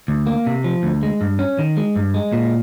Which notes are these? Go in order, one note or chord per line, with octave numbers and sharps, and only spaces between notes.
D2
A#3
C3
F3
D2
G#3
G2
C#4
D#3
G#3
G2
G#3
A#2